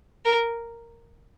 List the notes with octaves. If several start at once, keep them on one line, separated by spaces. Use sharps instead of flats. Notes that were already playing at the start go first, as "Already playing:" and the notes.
A#4